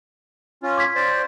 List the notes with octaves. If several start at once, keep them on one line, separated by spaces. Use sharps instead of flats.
C#4 F4
D6 G#6 B6
C5 D5